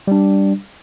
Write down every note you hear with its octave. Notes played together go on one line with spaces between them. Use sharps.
G3 D4